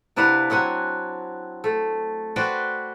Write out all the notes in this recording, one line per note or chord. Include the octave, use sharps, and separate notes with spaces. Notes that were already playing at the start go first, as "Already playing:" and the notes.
C3 D4 E4 B4 F5 F#5
F#3 C4 F#5 G#5
A3
F#4 B4 C5 D5 G5